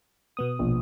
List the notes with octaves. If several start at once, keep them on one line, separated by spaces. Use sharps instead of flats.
B2 B3 D#6
A#1